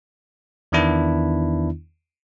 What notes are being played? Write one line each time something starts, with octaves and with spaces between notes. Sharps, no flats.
E2 D#3 B3 D4 E4